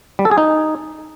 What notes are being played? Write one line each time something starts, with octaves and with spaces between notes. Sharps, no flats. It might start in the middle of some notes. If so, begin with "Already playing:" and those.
G3
A4
G#4
D#4